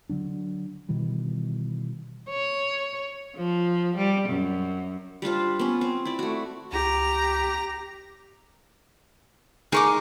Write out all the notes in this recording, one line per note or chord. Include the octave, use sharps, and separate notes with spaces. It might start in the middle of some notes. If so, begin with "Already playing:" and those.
D3 F#3 D4
B2 D#3 E3 G3
C#5
F3
G3
F#2
G3 D4 F4 C5
B3 C#4
C4
E4 D5
A3 F#4
C#2 G4 A#5
G#3 D#4 G#4 A#4 C#6 D6